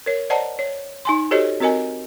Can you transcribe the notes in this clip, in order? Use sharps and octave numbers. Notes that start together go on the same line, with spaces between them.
A#4 C#5
C5 D5 D#5 F#5 A5 A#5
C#5
D#4 G#5 C6
F#4 G4 A4 C5 C#5 D#5
C4 F#4 A#4 D#5 G#5